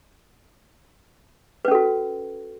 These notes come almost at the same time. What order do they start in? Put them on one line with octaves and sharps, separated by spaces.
B4 C#4 A4 F#4